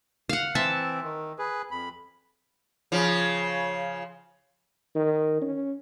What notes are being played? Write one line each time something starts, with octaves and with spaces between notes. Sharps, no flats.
F5 F#5
E3 C4 E5 A5
D#3
G#4 B4
F2 B5
C#3 F3
D#3
C#4